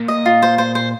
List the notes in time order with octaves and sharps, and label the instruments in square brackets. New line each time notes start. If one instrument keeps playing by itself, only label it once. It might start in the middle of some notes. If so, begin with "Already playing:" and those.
Already playing: [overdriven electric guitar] A#2
[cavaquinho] D#5
F4
C5
C5
C5